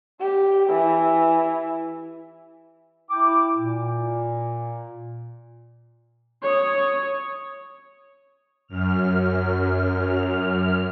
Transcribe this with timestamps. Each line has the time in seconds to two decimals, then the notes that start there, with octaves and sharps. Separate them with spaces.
0.20 G4
0.69 E3
3.10 E4 G5 D6
3.57 A#2
6.43 C#5 D#6
8.67 F#2 F6